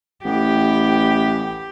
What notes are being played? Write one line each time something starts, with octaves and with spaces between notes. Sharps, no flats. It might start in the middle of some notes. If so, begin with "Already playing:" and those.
A1 E3 B3 G4 G5